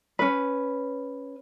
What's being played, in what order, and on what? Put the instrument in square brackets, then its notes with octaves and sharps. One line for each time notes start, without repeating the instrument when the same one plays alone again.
[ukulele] C#4 B4